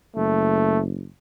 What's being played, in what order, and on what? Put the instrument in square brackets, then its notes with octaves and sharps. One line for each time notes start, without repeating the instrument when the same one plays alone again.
[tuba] F#1 [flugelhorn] A3